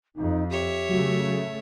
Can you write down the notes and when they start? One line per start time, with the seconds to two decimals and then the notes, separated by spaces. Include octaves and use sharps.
0.16 F2 D#4
0.51 G4 C#5 E5
0.89 C#3 F#3 A3 F#4